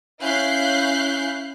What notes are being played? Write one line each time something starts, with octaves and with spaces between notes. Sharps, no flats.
C#4 E4 F5 F#6 G6 C7